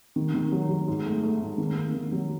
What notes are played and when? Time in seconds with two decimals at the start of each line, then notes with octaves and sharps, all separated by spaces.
0.16 D#3
0.34 D#3
0.52 F#3
0.69 F#3
0.88 G#2
1.06 A3
1.23 A3
1.41 G#2
1.58 D#3
1.76 A#3
1.94 D#3
2.12 F#3